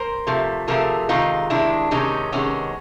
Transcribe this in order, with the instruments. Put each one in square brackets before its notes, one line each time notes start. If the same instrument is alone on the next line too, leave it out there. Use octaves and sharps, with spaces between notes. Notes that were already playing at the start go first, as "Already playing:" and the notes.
Already playing: [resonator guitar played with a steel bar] A#4 C5
C3 F3 A3
C3 F3 A3 G#4 A#4
C3 D#3 G#3 D#4 F4
C3 D#3 G#3 D4 E4
C3 D#3 G#3 C#4 D#4
C3 D#3 G#3 B3 C#4